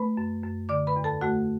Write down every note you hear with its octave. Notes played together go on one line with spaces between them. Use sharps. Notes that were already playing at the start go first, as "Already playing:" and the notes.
Already playing: A3 B4 B5
F#2
F#2
D3 D5 D6
B4 B5
E2
A4 A5
A3 F#4 F#5